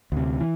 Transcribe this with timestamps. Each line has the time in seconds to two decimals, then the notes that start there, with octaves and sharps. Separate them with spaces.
0.12 D2 C3
0.40 E3